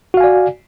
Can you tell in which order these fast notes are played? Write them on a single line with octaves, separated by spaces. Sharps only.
F#4 F5 G#5 D5